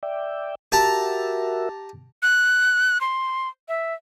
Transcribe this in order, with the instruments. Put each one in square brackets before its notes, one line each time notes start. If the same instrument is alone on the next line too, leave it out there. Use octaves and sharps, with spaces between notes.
[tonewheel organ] D5 E5 G5
[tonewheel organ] F#4 A#4 E5 [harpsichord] G4 A5 A#5
[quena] F#6
C6
E5